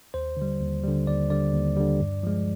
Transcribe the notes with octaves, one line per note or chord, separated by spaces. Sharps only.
D#2 C5
D3 G3
D#2
D3 G3
D#2 D5
D3 G3 D5
D#2
D3 G3
G2
F3 G#3